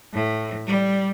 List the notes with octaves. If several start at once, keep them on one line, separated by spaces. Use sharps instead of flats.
A2
G3